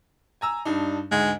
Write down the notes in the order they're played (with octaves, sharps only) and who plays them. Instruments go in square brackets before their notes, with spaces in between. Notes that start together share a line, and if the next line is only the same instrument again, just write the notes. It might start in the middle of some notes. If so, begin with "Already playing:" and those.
[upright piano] G#5 A#5 E6
G2 D4 D#4
[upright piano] D2 G#2 [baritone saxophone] G#3